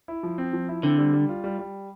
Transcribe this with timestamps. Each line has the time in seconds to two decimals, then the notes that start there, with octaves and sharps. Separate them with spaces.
0.08 E4
0.23 F3
0.38 C4
0.53 F3
0.69 E4
0.83 D3 C4
0.98 G3
1.13 G3
1.29 F4
1.44 G3
1.59 G3